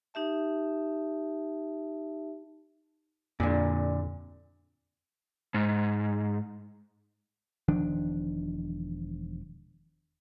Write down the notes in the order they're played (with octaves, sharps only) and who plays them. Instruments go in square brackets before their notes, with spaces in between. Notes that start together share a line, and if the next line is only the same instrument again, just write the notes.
[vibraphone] D#4 G4 E5 A5
[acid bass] F2 [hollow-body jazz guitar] A#2 D3
[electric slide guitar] G#2
[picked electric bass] E1 D#3 F3 D4